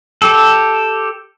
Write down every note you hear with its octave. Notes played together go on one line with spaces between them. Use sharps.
G4 A4